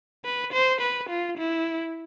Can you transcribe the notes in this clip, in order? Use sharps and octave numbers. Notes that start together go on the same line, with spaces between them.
B4
C5
B4
F4
E4